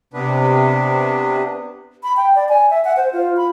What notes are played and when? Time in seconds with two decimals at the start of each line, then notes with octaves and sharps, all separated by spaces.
0.14 C3 B3 D4 B4
2.03 B5
2.17 G5
2.35 D5
2.49 G#5
2.70 E5
2.85 F#5
2.97 C5
3.13 F4
3.37 B5